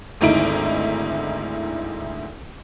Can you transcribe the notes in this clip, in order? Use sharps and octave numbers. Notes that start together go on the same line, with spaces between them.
G#1 D2 D#4 E4 D7